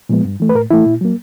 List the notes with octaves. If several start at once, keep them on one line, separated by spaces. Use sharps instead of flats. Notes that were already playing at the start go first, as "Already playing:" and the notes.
A#2 F3 G#3 B3
G2
E3 A3
B4
A2 A#4
E3 A3 E4
A#2
F#3 A#3